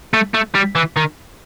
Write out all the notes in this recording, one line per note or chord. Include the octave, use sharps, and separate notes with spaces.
A3
A3
G3
E3
D#3